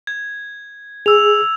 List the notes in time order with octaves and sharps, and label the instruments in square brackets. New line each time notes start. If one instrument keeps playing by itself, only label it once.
[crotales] G#6
[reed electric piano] G#4 [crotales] E6 F7